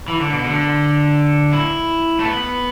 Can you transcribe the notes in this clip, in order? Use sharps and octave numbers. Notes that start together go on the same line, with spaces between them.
E3
D3
B2
D3
E4
A3
B3